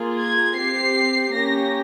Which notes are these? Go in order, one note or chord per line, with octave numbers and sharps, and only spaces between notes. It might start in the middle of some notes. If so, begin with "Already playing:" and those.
Already playing: A#3 F4 G#4
G#6
C4 G4 C7
A#3 C#4 G4 A#6